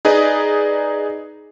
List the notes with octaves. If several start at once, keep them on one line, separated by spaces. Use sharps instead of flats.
D#4 G#4 B4 D5 D#5